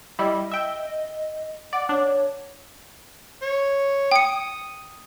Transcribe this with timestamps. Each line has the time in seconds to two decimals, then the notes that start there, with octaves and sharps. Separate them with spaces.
0.19 G3 E4 D#5
0.51 E5 G5
1.73 D5 F#5
1.89 D4 C#5
3.42 C#5
4.11 G5 D#6 C#7